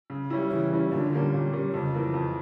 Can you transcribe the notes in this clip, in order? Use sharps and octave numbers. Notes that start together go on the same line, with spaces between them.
C#3
G3 C#4 E4
C#3 E3
G3 C#4 E4
A#2 D3
G3 A#3 C#4
A#2
G3 A#3 C#4
F2 C#3
E3 A#3
F2